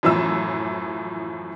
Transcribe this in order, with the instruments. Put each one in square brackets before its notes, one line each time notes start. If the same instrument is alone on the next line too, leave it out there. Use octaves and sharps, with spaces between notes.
[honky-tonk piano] F#2 A2 E3 F3 E6